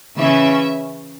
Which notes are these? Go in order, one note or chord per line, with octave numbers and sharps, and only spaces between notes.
C#3 E3 C#4 E5